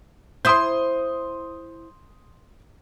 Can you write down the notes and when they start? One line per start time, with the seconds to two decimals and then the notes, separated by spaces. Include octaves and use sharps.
0.45 E4 C5 C6 D#6 G6